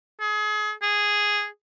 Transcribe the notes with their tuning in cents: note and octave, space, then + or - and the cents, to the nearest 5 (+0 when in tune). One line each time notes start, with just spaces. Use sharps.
G#4 +30
G#4 -5